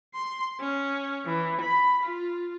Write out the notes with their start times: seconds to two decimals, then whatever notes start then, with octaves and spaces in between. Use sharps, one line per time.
0.14 C6
0.60 C#4
1.25 E3
1.61 B5
2.03 F4